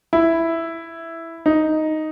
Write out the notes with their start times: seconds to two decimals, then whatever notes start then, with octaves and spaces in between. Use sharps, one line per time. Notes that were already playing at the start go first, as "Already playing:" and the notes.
0.13 E4
1.46 D#4